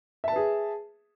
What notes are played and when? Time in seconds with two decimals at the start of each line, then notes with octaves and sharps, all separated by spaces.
0.24 E5
0.28 A5
0.32 B4
0.36 G#4